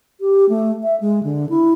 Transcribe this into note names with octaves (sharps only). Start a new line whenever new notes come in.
G4
A3
E5
G#3
D3
E4